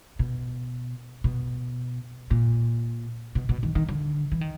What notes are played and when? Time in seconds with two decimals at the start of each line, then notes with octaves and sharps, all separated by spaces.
0.19 B2
1.24 B2
2.31 A#2
3.35 B2
3.49 B2
3.63 D#3
3.75 D#3
3.89 D3
4.32 E3
4.41 D#3